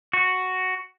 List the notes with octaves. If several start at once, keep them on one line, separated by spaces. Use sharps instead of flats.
F#4